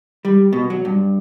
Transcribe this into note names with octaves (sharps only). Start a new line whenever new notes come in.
G3
B2
F#3
G2